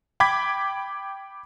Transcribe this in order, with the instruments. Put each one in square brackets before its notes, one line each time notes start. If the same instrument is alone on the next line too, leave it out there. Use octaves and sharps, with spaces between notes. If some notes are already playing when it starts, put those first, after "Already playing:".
[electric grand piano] G5 B5 D6 G#6 B6